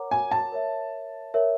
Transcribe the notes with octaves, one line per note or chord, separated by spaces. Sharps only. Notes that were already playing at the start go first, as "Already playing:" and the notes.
Already playing: A#4 C#5 F#5 A#5 D6
G#5
A5
A#4 C#5 E5
A#4 C#5 E5